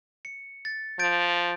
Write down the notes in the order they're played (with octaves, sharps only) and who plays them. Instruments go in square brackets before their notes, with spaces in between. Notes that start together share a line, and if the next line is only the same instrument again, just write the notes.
[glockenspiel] C#7
A6
[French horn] F3 [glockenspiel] G6 A6 D7